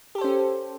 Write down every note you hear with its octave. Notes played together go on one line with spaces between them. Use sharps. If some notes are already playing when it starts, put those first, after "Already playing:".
C#4 G4 A4 C5